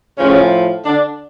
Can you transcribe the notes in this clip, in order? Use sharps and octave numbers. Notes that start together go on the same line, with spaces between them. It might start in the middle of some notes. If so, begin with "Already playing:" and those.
A2 C#3 F3 C#4
D3 D4